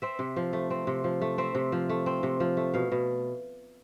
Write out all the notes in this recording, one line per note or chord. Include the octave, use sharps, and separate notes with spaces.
C4 E5
C3
F3
A3
C4
C3
F3
A3
C4 E5
C3
F3
A3
C4
C3
F3
A3
B2 F5
B2